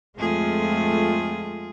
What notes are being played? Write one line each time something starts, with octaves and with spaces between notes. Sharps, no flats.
F2 G#3 A3 F4 G#4